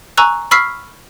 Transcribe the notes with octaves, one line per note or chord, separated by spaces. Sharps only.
G#5 A#5 C#6 E6 F#6
B5 C#6 E6 F6 B6 C7